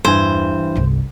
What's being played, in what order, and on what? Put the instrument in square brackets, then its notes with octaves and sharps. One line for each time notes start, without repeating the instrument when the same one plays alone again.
[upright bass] E2 [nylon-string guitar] G2 E3 G#5 [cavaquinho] C5
[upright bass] G1 C2